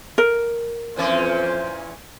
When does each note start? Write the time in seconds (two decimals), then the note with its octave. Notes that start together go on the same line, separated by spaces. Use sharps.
0.18 A#4
0.96 F2 A#2 E3 C#4 C5